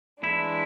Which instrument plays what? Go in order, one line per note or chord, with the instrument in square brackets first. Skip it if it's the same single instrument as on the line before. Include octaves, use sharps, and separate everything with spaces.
[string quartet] E3 G#3 D4 [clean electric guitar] E4